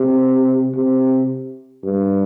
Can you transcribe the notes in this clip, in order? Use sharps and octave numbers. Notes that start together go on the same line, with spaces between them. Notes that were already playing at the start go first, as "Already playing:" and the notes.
Already playing: C3
C3
G2